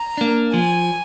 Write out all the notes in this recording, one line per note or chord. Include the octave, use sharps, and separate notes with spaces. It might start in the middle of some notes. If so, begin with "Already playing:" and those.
Already playing: A#5
A#3 D4
F3 G#5